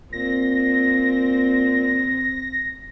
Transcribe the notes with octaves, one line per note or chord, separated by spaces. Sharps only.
A#2 C4 A#6